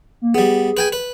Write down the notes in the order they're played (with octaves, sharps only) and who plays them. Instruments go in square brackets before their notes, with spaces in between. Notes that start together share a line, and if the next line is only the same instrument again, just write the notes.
[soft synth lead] A#3
[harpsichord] G3 B3 [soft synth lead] G#4
[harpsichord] B4 G5 G#5
B4